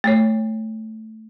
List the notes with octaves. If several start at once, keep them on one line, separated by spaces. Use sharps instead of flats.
A3 C#5